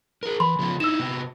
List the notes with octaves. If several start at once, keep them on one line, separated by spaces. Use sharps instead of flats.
G#4 A#4
E3 B5 C6
C#3 F3 B3
D#4 E4 E6 E7
C3 B3